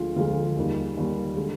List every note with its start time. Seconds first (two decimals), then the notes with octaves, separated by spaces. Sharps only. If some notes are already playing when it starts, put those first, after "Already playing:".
Already playing: D2 D3 F3 G#3 F4
0.16 D2 D3 F3 G#3 F4
0.57 D#2 D#3 G3
0.97 D#2 D#3 G3
1.36 D3 G#3